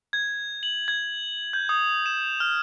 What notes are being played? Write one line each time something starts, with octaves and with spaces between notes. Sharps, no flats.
G#6
F#7
G#6
G6
D#6
E7
F6